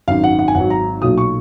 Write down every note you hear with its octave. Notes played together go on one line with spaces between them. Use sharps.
G#1 F#2 D#3 F5
F#5
F#5
G#5
G#1 G#2 F#3 F#5
A#5
B1 A#2 F#3 D#6
C#6